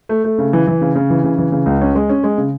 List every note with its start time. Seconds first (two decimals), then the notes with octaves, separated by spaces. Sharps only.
0.09 A3
0.24 A3
0.39 C#3
0.53 E3
0.67 E3
0.81 C#3
0.95 C#3
1.10 E3
1.24 C#3
1.38 E3
1.52 C#3
1.66 C#2
1.81 C#4
1.95 G#3
2.09 C#4
2.24 G#3
2.38 C#3